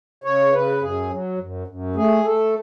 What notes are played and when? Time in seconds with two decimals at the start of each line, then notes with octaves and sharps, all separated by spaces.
0.24 C#3 C#5
0.52 C#3 B4
0.81 F#2 G#4
1.10 F#3
1.39 F#2
1.67 F#2
1.96 A3 G#4
2.24 A3 A4